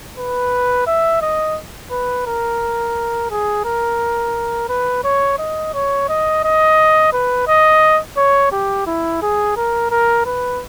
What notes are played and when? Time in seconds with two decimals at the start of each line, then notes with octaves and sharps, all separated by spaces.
0.17 B4
0.87 E5
1.22 D#5
1.91 B4
2.27 A#4
3.30 G#4
3.65 A#4
4.69 B4
5.04 C#5
5.39 D#5
5.74 C#5
6.09 D#5
6.44 D#5
7.13 B4
7.47 D#5
8.17 C#5
8.52 G4
8.87 E4
9.22 G#4
9.57 A#4
9.91 A#4
10.26 B4